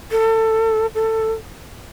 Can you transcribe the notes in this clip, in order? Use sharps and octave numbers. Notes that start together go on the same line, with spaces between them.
A4
A4